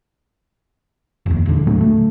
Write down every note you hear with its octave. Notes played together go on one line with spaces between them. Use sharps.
F1 D#2
D#1 E2 D3
A2 D3 F#3 A3
A3